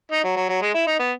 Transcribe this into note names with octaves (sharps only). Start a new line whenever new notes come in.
D#4
F#3
F#3
F#3
G#3
E4
D#4
B3